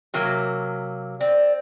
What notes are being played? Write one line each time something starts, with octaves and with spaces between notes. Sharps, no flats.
C3 F#3 A#3
C4 D5